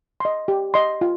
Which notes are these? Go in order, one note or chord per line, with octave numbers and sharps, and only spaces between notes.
D#5 C6
G4
D#5 C6
F4